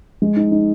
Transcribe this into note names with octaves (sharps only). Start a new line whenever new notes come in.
G#3
D#4
D#4